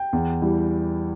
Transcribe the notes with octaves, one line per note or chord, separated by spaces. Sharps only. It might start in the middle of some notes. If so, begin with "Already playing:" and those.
Already playing: G5
E2
E3 G3